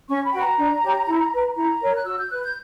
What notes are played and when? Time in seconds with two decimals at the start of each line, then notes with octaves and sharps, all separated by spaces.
0.09 C#4 C#6
0.26 B5
0.33 F#4 B4 G5
0.42 A#5
0.58 D4
0.83 G4 C#5
1.08 E4
1.33 B4
1.56 E4 A#5
1.81 A#4 C#5
1.96 F#6
2.05 F#4 E6
2.19 G6
2.30 B4 F#6
2.43 G6